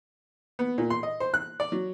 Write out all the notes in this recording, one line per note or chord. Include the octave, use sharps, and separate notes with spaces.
B3
A#2
C6
D#5
C5
F#6
D5
F#3